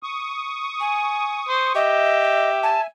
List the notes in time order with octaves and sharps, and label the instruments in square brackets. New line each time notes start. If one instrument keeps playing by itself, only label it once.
[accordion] C#6 D#6
[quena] G#5
[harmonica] C5
[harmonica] G4 [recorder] D#5 [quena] E5
[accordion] G#5 [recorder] A5